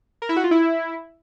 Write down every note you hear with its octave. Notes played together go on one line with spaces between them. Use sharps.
A#4
E4
F#4
F4
E4